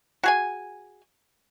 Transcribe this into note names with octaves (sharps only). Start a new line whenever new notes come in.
F#4 G#4 G#5